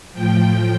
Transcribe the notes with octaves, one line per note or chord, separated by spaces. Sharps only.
A2 F3 G5